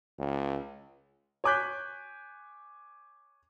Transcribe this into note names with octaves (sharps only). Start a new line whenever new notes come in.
C#2
C#5 G#5 D6 F#6 G6 B6